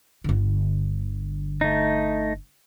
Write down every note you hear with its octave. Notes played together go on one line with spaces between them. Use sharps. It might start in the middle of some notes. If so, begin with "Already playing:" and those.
G1 D3
A3 D#4